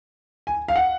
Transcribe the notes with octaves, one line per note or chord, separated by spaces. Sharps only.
G#5
F5
F#5